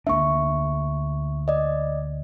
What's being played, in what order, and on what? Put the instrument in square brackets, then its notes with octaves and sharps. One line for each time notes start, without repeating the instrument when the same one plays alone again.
[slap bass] D2 A#3 D4 [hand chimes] E5 C#6
[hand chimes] D5 D#5